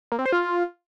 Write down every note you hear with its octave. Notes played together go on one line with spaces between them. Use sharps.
A#3
C4
C5
F4